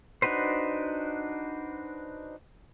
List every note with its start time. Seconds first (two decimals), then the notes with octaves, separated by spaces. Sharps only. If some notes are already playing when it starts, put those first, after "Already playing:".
0.22 D4 D#4 F#4 B4 C5